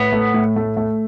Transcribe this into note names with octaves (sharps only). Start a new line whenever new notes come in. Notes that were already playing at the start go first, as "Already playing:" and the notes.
Already playing: A2 B3
A3
A2
A3
A3